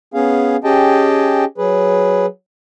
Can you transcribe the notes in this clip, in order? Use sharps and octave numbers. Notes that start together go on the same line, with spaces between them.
B3 C#4 G#4 F5
C#4 G4 G#4 D#5 G5 A5
F#3 G#4 B4